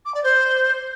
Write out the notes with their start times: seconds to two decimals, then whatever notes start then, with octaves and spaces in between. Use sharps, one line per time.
0.05 D6
0.14 D5
0.24 C5